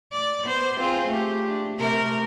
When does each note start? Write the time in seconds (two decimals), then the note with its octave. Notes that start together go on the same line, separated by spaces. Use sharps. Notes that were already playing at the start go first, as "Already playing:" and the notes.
0.12 D5
0.45 B3 C5
0.78 C4 F4 G#4
1.08 A3 G4
1.47 D4
1.77 C3 A3 A#4